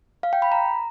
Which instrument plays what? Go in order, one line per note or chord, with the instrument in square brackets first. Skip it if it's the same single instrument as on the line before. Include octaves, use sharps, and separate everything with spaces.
[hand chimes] F5
G5
B5
A#5